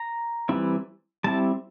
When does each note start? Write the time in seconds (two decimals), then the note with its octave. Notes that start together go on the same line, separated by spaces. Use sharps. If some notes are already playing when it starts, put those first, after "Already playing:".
Already playing: A#5
0.49 E3 G3 C4 E4
1.24 G3 C4 E4 A5